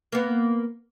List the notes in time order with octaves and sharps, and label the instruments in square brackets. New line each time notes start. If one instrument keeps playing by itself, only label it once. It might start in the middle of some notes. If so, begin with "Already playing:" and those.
[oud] A#3 B3